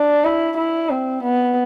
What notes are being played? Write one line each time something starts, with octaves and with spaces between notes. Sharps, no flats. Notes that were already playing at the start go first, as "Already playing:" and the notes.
Already playing: D4
E4
E4
C4
B3